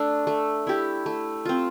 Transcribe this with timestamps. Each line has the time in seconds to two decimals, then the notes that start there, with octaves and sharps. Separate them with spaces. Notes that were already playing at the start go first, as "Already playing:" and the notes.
Already playing: A3 D4
0.27 A3
0.67 E4 G4
1.06 A3
1.45 C4 F4